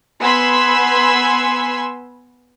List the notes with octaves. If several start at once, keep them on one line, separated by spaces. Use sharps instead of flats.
B3 G#5 B5 C6 E6 G#6